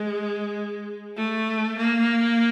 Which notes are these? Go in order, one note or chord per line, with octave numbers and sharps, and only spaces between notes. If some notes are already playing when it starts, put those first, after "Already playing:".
Already playing: G#3
A3
A#3